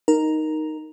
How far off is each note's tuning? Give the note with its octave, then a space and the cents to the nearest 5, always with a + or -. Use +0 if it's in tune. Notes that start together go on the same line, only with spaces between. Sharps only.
D#4 +0 A#4 +0